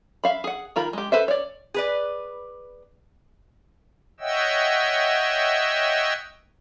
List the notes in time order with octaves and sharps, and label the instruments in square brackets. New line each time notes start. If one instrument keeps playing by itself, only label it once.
[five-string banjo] E5 F5 B5
G#4 F#5
D#3 F4 A#4 B5
G#3 G4
A4 B4 C5 E5
C#5 D5
[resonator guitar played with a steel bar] G#4 B4 D5
[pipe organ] C#5 D#5 E5 F#5 G5 E6